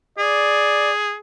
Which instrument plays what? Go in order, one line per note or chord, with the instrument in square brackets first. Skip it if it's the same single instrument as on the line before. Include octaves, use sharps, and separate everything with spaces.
[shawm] G#4 [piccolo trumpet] D5